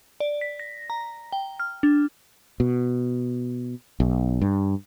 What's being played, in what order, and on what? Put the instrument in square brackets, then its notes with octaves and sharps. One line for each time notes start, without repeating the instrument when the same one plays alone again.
[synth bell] D5
B6
A#6
A#5
G5
F6
D4
[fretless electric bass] B2
B1
G2